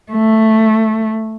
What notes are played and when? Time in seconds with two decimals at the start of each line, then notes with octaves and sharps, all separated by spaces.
0.11 A3